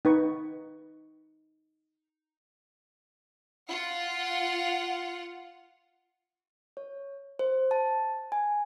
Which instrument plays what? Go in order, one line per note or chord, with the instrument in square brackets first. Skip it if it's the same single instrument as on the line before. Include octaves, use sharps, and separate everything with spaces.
[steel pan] D#4 B4 C#6
[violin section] F4 F#5
[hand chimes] C#5
C5
A5
G#5